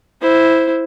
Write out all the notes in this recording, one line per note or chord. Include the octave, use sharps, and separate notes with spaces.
E4 C5